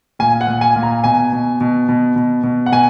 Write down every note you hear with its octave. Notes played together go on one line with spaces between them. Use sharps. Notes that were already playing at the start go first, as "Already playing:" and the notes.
A#2 G#5
F#5
A#2
G#5
A#2
A#5
B2 G#5
B2
B2
B2
B2
B2
F#5
B2 G#5